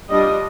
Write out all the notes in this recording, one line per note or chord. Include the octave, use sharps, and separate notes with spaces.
G3 D4 F4 D#5